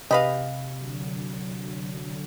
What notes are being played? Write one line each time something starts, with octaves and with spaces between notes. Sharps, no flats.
C3 G4 B4 D#5 F5
D3 F#3